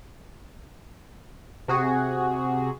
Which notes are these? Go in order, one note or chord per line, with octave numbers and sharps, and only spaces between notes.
C3 F#4 G#4